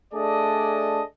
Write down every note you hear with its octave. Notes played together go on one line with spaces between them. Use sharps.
A3 D4 G#4 A4 D5 D#5